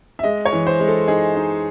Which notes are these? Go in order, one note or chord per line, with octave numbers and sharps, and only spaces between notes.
E5
G#3 D#5
C#5
E3
C5
G#3
A4
D#4 G#4
D#4